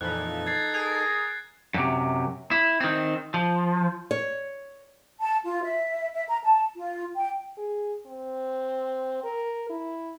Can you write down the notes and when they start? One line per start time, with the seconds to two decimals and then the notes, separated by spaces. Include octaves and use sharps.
0.01 F2 A#2 E3 D#4 A4 F#6
0.47 G#6 A6 C7
0.74 G#4 A#4
1.74 F#2 C3
2.51 E4
2.81 D#3 C4
3.34 F3
4.11 C#5
5.21 A5
5.44 F4
5.63 E5
6.14 E5
6.29 A#5
6.43 A5
6.76 F4
7.16 G5
7.58 G#4
8.06 C4
9.24 A#4
9.70 E4